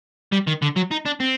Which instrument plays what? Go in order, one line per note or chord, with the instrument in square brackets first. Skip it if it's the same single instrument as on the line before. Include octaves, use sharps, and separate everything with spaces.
[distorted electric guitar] G3
D#3
D3
F#3
D#4
D4
C4